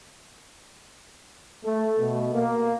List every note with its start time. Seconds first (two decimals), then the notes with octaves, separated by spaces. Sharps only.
1.62 A3
1.98 B2
2.32 A#3